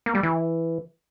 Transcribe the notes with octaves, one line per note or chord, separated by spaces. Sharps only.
A#3
G3
E3